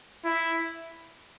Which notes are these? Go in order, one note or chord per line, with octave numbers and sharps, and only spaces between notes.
E4